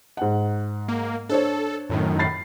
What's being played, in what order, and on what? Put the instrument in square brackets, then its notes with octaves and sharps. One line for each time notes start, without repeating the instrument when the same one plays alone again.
[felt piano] G#2 F#5
[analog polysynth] A#3
[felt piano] D4 C5 C#5 [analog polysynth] A4
[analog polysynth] F#2 A2 D#3
[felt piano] B5 A6 C7